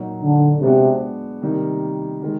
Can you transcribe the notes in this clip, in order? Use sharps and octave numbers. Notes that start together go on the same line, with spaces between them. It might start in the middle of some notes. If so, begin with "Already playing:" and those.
Already playing: A#2 F#3 A#3 D#4 F#4
D3
C3 G#3 B3 D4 F#4
C3 D#3 G3 A#3 D#4
D#3 G#3